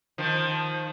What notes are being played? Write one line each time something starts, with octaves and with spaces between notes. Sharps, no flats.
D#3 F3